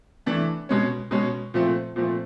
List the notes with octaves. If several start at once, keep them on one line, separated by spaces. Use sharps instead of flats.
E3 A3 D4
B2 G#3 C#4
B2 G#3 C#4
A#2 F3 A3 C4
A#2 F3 A3 C4